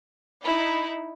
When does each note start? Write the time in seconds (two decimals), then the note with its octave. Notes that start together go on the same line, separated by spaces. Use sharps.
0.43 D#4 E4